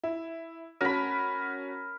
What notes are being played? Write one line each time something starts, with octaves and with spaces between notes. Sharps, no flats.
E4
C#4 F#4 A#4 B5